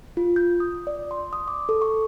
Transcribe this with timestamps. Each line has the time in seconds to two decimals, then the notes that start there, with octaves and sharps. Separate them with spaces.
0.17 F4
0.36 G6
0.60 D#6
0.87 D5
1.11 C6
1.33 D#6
1.48 D6
1.69 A4
1.82 C#6